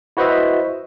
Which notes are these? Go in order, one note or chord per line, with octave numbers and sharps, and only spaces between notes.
E4 F#4 B4 C5 D#5 E5